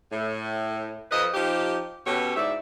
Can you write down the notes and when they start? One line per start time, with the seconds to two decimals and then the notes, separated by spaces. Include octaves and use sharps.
0.12 A2
1.11 F2 F3 B4 D#5
1.34 F3 D#4 G4
2.06 B2 C#4 G4 A4 C#5
2.36 G#2 E4 D5 E5